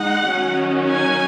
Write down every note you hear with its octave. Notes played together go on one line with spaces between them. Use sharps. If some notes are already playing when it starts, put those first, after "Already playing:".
Already playing: G#3 D#4 F#5
D#3 F#3 C#4
G#5